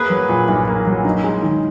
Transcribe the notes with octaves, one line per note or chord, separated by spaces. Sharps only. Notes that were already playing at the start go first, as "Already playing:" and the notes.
Already playing: A#3 G#4 B4
F#3
A#2
B1
A#3
F#3
D#4
G#3
D#3